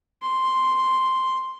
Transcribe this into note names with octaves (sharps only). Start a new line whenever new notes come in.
C6